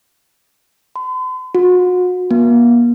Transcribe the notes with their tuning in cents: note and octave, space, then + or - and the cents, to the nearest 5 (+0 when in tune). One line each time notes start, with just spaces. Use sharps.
C6 -45
F#4 -40
A#3 +40